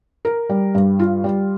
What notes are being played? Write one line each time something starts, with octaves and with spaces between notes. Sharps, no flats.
A#4
G3
G2
F4
G3